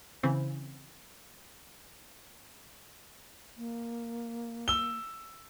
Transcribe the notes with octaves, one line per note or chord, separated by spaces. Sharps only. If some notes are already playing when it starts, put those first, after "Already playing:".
C#3 E3 C4
A#3
E6 G7